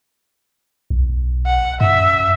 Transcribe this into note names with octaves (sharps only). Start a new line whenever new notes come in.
B1
F#5
F#2 E5